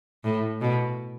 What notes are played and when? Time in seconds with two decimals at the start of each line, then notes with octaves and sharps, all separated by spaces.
0.24 A2
0.61 B2